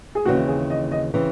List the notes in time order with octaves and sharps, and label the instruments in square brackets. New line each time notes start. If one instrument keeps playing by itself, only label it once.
[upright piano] G#4
[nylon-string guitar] D#2 C#3 E3 C4 [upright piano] F#4
[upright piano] G#4
D#5
D#5
[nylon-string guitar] C#3 E3 C4